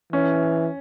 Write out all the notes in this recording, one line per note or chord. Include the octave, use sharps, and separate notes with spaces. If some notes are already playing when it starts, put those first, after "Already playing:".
E3 C#4